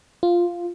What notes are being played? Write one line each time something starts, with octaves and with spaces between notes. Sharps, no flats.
F4